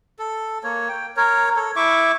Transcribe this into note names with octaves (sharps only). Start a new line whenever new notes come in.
A4
A#3 C#5
G5
A#4 C#5
A4 C#5
E4 E5 C#6 D6